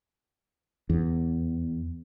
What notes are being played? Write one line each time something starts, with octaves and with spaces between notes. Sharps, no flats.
E2